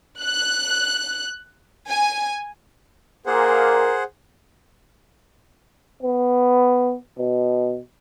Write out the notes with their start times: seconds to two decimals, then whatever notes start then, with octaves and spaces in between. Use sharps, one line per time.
0.20 F#6
1.87 G#5
3.26 A#2 A#3 G#4 A#4 C5 F#5
6.03 B3
7.18 B2